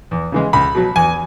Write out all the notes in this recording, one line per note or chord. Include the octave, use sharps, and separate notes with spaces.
E2
C#3 E3 G#3
C#2 B5
B2 F#3
E2 G#5